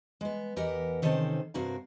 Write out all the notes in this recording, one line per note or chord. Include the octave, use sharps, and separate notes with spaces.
G#3 B3
E2 G4 A#4 B4 D#5 F#5
C3 D#3 C4 C#4 A4 C5
G2 C3 F#4 A#4 F5